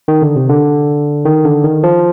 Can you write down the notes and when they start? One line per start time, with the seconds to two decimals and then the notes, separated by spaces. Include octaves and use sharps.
0.08 D#3
0.22 D3
0.36 C3
0.49 D3
1.25 D#3
1.45 D3
1.64 D#3
1.83 F3